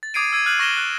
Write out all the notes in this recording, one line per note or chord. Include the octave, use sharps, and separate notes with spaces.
A6
D6 D#6 G#6 C7 D7 D#7
E6 G#6 D#7
F6 F#6 G#6 C7 D#7 F#7
C#6 A#6 D#7 E7 G7
F#6